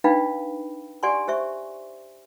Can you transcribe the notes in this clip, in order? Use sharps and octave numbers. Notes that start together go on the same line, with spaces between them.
D4 D#4 B4 F5 G5 B5
G4 D5 F#5 G#5 C6 C#6
G4 C5 E5 C#6